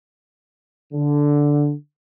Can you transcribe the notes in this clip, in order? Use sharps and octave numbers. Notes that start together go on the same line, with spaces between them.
D3